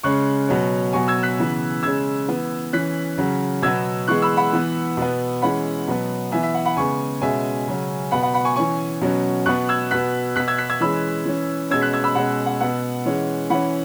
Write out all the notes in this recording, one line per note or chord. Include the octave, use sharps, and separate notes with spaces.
C#3 G#3 C#4 C#6 F#6
B2 F#3 C#4
B2 F#3 B3 G#5 C#6
E6 G#6
F#6 B6
C#3 E3 B3
C#3 G#3 C#4 E6 G#6
E3 B3
E3 C#4 F#6 B6
C#3 F#3 C#4
B2 F#3 B3 E6 G#6
E3 G#3 B3 C#6 F#6
B5 E6
F#5 B5
E3 B3
B2 B3
E3 G#3 C#4 F#5 B5
B2 F#3 B3
E3 B3 E5 G#5
E5
F#5
F#5 B5
C#3 G#3 B3 G#5 C#6
B2 G#3 C#4 E5 G#5
C#3 F#3 C#4
B2 B3 F#5 B5
F#5 B5
F#5 B5
G#5 C#6
E3 C#4 G#5 C#6
B2 F#3 C#4
B2 B3 C#6 F#6
E6 G#6
B2 B3 F#6 B6
B2 B3 F#6 B6
E6 G#6
F#6 B6
E6 G#6
E3 G#3 C#4 B5 E6
E3 C#4
B2 G#3 C#4 E6 G#6
F#6 B6
E6 G#6
B5 E6
B2 G#3 C#4 F#5 B5
F#5
B2 B3 F#5
E3 G#3 C#4
E3 C#4 F#5 B5